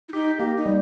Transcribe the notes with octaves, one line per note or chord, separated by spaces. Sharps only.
E4
D#4 G4
A#3 G4
D#4
G3